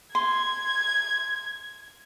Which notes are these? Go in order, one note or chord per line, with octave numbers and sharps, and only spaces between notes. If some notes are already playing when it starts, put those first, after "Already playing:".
C6 G#6